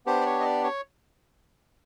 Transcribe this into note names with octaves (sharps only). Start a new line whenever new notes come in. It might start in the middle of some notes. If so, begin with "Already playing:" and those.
B3 D4 G4 C5
D5
C#5
D#5
D5
C#5